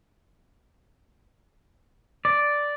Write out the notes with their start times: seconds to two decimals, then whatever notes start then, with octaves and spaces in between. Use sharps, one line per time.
2.25 D5